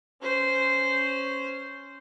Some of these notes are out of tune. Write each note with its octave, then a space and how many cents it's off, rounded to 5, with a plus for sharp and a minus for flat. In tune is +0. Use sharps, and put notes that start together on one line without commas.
C#4 +0 C5 -10